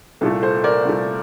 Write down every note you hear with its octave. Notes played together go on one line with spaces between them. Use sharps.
C2 A#2 A3 A4
A4 C5
A#4 D5
C2 A#2 A3